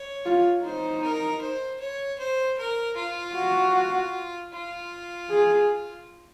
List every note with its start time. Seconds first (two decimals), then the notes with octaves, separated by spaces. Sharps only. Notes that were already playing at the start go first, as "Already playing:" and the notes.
Already playing: C#5
0.25 F4
0.64 D#4 C5
1.03 A#4
1.42 C5
1.80 C#5
2.19 C5
2.58 A#4
2.97 F4
3.35 F#4
4.53 F4
5.30 G#4